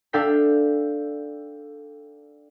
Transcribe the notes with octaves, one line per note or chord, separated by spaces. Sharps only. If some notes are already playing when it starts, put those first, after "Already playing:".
D4 A4 E5 F5 G5 B6